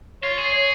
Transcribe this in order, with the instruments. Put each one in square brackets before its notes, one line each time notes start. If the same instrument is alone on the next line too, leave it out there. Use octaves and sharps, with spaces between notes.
[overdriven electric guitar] F4 [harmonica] C#5
[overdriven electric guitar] G#4
[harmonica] C#5